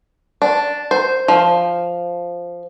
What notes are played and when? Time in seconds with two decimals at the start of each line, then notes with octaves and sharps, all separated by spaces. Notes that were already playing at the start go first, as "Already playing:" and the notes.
0.42 D4
0.91 C5
1.28 F3